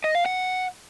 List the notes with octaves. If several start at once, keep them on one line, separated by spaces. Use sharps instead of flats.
D#5
F5
F#5